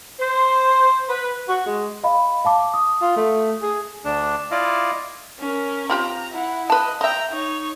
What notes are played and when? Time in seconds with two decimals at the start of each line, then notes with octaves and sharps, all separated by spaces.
0.19 C5
1.08 B4
1.48 F#4
1.65 G#3
2.04 D#5 F5 B5
2.45 F5 A5 D6
2.74 D#6
3.02 F4
3.17 A3
3.62 G#4
4.05 D2 D4
4.51 E4 F4 D5 D#5 F5
5.39 C#4 A#4
5.90 C4 F4 G4 A#5
6.32 E4 F#5
6.70 B4 D#5 A5
7.01 D#5 E5 G5 A#5
7.31 D#4 C#5